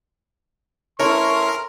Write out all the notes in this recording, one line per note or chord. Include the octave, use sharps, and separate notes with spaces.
A3 C#4 E4 A#4 C#5 C6